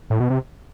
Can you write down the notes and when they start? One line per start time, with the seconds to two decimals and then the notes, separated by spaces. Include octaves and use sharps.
0.10 A2
0.20 B2
0.30 C3